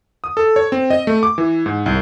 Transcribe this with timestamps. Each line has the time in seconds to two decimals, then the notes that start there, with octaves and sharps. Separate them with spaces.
0.24 D#6
0.37 A4
0.56 C#5
0.72 C4
0.90 D#5
1.07 A3
1.23 D6
1.38 E3
1.66 G#2
1.86 C2